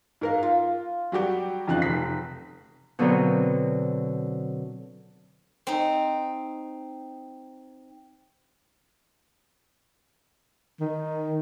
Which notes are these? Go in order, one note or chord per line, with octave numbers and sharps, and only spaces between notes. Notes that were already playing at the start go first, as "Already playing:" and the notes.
G#2 A#4 F5
F4
F#3 G3 F#4 G4
F2 C#3 F3 D#4 F#6
F1 B6
B2 D3 F#3 C4 A#4 B4
C4 D#4
D#3